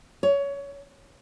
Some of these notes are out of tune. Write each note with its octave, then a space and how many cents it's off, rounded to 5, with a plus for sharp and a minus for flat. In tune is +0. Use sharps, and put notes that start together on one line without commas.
C#5 +20